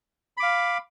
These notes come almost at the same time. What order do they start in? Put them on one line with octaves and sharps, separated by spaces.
B5 D6 F5